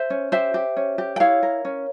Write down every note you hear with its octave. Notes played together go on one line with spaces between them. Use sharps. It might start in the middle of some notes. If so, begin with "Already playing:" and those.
Already playing: C5 E5
C#4
G4 C5 E5
G4
C#4
G4
G5
E4 C#5 F5
A#4
C#4